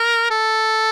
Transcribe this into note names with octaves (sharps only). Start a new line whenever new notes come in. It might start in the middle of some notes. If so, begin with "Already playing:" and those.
Already playing: A#4
A4